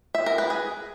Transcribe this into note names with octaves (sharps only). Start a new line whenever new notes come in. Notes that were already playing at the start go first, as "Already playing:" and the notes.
E5
A#4
B4
G#4